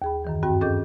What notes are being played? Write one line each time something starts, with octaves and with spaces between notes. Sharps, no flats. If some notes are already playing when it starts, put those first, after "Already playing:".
D#2 G#4 B5
F#2 D#3 E3
G2 C4 F#4 G5
C#4 G#4 A4 D#5 D6 G6